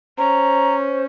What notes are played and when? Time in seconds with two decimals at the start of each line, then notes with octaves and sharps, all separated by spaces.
0.18 C#4 C5 A#5